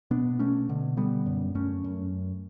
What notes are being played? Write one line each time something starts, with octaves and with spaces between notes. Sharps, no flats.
B2 B3 D4
B2 A3 C#4
B2 D3
D3 G3 B3
F#2
F#2 A3 C#4
F#2